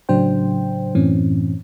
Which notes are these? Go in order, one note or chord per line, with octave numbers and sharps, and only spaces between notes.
A2 C#3 F#3 D4 C5 G5
F#2 A2 E3 C4 C#4